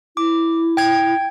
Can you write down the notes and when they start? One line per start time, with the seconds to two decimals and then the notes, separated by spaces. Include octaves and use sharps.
0.17 E4 D6
0.77 G5 G#6